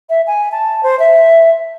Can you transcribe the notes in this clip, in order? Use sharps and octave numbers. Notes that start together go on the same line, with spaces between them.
E5
G#5
A5
C5
E5